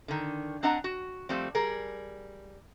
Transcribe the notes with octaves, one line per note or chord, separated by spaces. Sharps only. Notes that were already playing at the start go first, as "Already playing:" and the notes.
D3 D#3
C4 D4 D#5 F#5 A#5
F#4
F3 G3 A3 C4
G3 G#4 A#4